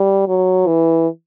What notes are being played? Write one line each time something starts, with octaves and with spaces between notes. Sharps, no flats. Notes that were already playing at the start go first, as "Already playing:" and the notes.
Already playing: G3
F#3
E3